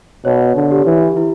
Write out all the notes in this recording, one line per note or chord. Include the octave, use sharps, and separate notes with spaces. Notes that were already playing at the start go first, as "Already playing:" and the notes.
B2 C#5
D3
G4
E3
E4